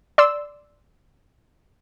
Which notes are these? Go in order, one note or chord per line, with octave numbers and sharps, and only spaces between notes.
D5 C6 E6